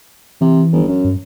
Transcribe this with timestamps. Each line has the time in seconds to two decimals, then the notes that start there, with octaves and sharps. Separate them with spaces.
0.41 C3 E3
0.73 G1
0.87 F#2
1.05 G2